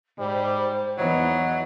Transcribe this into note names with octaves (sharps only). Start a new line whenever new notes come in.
G#2 G3 C5
E2 E3 F#3 D#4 D#5